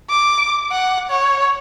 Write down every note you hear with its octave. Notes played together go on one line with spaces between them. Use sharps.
D6
F#5
C#5